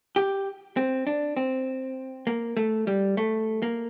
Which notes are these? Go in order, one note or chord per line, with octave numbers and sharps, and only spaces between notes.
G4
C4
D4
C4
A#3
A3
G3
A3
A#3